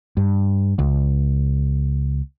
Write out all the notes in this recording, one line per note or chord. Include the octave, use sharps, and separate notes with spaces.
G2
C#2